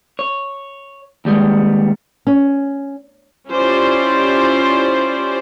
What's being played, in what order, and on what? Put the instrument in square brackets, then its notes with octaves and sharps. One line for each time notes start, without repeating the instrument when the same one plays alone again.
[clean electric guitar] C#5
D#2 G3 G#3 B3
[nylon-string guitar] C#4
[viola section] C#4 E4 F4 G4 C5 D5